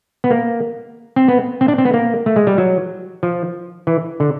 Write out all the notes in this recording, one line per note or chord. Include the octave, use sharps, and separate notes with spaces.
B3
A#3
C4
B3
C4
D4
C4
B3
A#3
A3
G#3
G3
F#3
F3
E3
D3